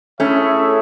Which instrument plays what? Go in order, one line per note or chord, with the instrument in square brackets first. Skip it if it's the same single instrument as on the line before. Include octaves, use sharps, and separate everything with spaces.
[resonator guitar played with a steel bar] A3 C#4 [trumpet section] E4 G#4 C#5 E5